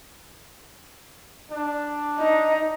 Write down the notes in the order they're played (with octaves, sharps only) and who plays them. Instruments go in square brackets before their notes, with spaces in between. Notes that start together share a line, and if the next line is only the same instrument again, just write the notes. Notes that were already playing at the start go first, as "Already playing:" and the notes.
[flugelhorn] D4
[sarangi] D#4